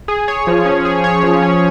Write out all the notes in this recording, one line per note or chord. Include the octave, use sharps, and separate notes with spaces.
G#4
C#5
F3
C#4
G#4
C#5
F3
C#4